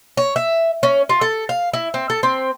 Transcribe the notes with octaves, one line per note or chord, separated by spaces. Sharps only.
C#5
E5
C#4
F4
A4
F5
E4
C4
A4
C4